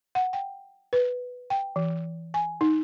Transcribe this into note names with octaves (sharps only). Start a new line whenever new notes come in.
F#5
G5
B4
G5
E3
G#5
D#4